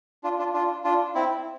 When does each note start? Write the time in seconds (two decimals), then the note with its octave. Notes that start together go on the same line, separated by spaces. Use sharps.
0.24 D4 F4
0.39 D4 F4
0.53 D4 F4
0.84 D4 F4
1.15 C4 E4